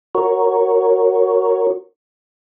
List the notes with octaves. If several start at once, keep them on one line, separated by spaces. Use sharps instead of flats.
F#4 A#4 C#5